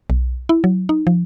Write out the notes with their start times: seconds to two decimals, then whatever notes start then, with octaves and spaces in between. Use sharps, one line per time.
0.10 B1
0.49 E4
0.64 F#3
0.89 D#4
1.07 F3